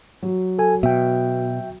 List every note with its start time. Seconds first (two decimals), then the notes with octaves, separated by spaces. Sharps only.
0.22 F#3
0.59 A4 G#5
0.83 B2 E5 G5